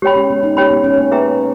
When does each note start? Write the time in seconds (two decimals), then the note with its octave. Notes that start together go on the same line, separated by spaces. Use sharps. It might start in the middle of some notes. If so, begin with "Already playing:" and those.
0.02 G#3 G4 C#5 G5 B5
0.16 C#4
0.30 B3
0.43 D#4
0.57 C#4 G4 C#5 G5 B5
0.71 B3
0.84 C#4
0.98 A#3
1.12 G#4 B4 E5 G5 A#5